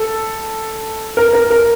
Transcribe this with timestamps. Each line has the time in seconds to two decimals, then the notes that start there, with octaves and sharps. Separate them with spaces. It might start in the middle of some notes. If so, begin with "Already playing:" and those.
Already playing: A4
1.17 A#4
1.33 A#4
1.50 A#4